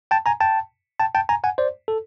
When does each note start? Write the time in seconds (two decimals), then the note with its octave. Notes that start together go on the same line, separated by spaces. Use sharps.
0.11 G5 A5
0.26 G#5 A#5
0.40 G5 A5
1.00 G5 A5
1.15 G5 A5
1.29 G#5 A#5
1.44 F#5 G#5
1.58 C5 D5
1.88 A4